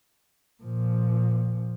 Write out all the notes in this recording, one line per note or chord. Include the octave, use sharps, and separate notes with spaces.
A#2 F3